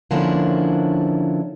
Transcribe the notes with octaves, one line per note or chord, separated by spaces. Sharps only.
D3 F3 A#3 C#4 D4 E4